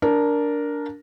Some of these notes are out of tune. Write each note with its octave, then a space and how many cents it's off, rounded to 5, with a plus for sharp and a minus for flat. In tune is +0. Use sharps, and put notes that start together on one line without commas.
D4 -10 A#4 +0